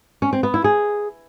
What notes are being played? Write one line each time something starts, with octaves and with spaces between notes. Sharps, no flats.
C#4
C4
B3
E4
G#4